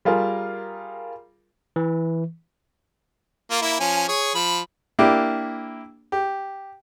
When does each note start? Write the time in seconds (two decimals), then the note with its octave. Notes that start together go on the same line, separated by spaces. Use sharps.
0.05 G3 F4 G#4 A#4
1.76 E3
3.51 A#3 F4
3.62 A#3 E4
3.80 F3 C#4 G#5
4.08 G#4 C#5
4.35 F3 B5
4.99 A#3 D4 E4 G4
6.12 G4